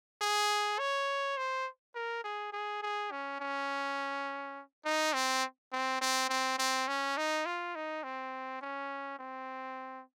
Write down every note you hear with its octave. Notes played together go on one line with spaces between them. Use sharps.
G#4
C#5
C5
A#4
G#4
G#4
G#4
C#4
C#4
D#4
C4
C4
C4
C4
C4
C#4
D#4
F4
D#4
C4
C#4
C4